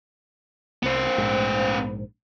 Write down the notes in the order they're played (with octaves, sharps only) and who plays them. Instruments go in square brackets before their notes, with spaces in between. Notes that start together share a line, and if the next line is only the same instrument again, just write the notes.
[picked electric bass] C2 [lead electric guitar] B3 C5
[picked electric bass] A#1 G#2